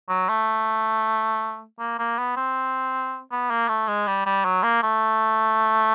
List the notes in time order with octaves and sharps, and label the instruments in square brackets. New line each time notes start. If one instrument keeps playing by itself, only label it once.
[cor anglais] F#3
A3
A#3
A#3
B3
C4
B3
A#3
A3
G#3
G3
G3
F#3
A#3
A3